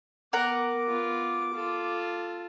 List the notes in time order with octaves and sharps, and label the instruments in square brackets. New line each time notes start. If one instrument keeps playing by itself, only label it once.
[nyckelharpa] B3 [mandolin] A#4 F#5 A#5 [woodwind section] D6
[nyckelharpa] B3 F4
F4 A4